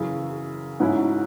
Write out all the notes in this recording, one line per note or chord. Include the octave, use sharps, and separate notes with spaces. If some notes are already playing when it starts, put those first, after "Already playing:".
Already playing: F#2 C#3 E3
G#2 F#3 C#4 E4